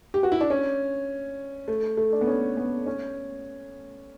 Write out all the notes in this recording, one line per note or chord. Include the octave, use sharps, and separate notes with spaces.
G4
F#4
E4
D4
C#4
A3
A3
D4
B3
C#4
B3
C#4